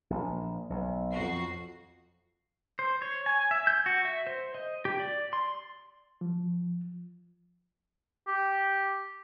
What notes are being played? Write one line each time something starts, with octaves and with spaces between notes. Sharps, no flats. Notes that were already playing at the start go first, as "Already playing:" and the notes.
A#1
B1
F2 F#4 C7
C5
C#5
G#5
E5
G6
F#4
E5
C5
D#5
G4
D5
C6
F3
G4